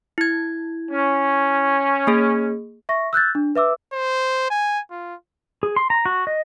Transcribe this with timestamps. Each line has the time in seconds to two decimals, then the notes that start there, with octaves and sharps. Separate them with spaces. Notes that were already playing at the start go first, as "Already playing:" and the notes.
0.18 E4 G#6
0.92 C#4
2.07 A#3 G#4
2.89 E5 C#6 A#6
3.13 E6 F#6 G6 A6
3.35 D4
3.55 B4 E5 D6 E6
3.93 C5
4.50 G#5
4.91 F4
5.63 G#4
5.76 C6
5.90 A#5
6.05 F#4
6.27 D#5